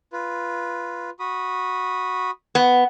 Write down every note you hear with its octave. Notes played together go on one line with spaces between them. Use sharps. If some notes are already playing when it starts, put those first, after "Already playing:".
F4 B4
F#4 B5 D#6
B3